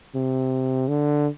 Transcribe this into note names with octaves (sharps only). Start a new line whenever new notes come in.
C3
D3